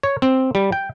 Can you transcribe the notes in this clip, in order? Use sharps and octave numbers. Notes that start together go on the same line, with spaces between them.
C#5
C4
G3
G5